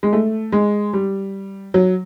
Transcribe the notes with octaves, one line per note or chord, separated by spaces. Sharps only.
G#3
A3
G#3
G3
F#3